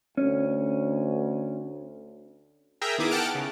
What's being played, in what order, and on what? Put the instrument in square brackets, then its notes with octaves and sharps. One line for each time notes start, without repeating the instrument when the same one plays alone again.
[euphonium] D2 [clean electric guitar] C#4
[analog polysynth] G#4 A#4 E5 G5 A#5
D#3 B3 E4 G#4 D6 D#6
F#5 G5 A5 F6 F#6 D7
C#3